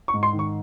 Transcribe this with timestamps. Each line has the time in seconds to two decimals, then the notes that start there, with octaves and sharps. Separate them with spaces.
0.08 C#6
0.13 G#2
0.23 C6
0.33 D#3
0.39 C#6